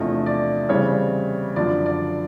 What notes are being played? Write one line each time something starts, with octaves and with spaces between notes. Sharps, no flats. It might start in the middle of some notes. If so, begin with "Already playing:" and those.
Already playing: E2 C3 F3 A3 D4 D#5
D5
C#3 E3 G3 C4 C#5
F#2 D3 F3 D5
D5